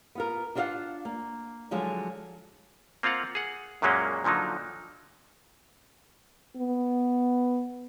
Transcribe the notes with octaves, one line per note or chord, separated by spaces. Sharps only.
B3 F4 A#4
D4 F4 F#4 D5 F5 F#5
A#3
D3 F3 F#3 G#3 F4
A#3 C4 F4 F5 F#5
G#4 F#5
F#2 A#2 F#3 G#3 A#3 C#4
A#2 D3 F3 F#3 D#4
B3